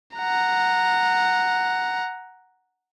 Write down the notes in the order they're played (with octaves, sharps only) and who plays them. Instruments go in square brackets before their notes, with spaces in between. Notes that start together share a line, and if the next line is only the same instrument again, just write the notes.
[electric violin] F#5 A#5